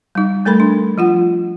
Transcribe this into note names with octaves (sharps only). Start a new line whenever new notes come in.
G3 D#4
G3 A3 A4 A#4 B5
D4
F3 F4 F#5